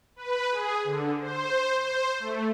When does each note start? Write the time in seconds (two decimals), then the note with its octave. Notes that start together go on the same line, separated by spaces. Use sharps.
0.16 B4
0.51 G#4
0.84 D3
1.20 C5
1.80 C5
2.20 A3